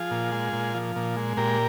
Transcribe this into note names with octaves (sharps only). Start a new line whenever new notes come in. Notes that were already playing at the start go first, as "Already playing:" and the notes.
Already playing: F3 F4 G#4
A#2
G#3
A#2
F3
A#2
G#3
A#2 G4 A#4